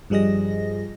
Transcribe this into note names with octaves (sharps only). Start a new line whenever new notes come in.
G2 F3 G3 G#4 D#5 A#6